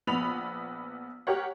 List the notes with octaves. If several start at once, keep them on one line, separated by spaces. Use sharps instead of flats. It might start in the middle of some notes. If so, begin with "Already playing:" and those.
A#1 B3 B5 F7
G4 A#4 C#5 F#5